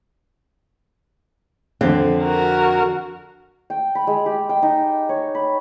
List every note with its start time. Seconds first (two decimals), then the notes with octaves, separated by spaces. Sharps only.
1.81 F2 D3 C4
2.23 F#4 A#4
3.70 G5
3.95 B5
4.07 G#3
4.26 G4
4.49 G5
4.62 D#4
5.09 C#5
5.35 B5